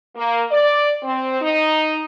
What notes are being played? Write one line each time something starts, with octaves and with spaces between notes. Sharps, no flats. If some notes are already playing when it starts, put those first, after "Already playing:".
A#3
D5
C4
D#4